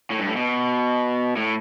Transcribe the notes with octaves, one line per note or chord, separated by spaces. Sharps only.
A2
G2
A2
B2
A2